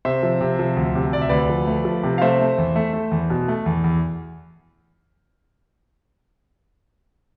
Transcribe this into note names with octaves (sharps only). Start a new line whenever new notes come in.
C3 C5 E5
F3
C3
F3
D2
C3
D2 D5
E5
D2 B4 D5
F3
A3
F3
C3
F5
A3 C5 E5
A3
E2
A3
A3
E2
B2
A3
E2
E2